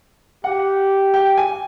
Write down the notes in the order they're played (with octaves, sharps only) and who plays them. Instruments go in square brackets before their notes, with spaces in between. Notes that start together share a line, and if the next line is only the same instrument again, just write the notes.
[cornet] G4 [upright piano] F#5
[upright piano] G5
G#5